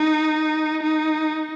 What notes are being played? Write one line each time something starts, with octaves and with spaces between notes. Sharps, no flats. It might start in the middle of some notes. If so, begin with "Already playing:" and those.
Already playing: D#4
D#4